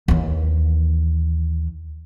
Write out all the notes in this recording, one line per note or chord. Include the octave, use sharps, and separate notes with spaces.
D#2 E3